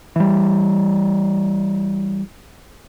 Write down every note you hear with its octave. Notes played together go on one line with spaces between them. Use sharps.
E3 G3